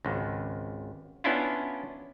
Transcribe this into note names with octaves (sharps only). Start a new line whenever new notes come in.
G#1 C#2
B3 C#4 D4 E4 F4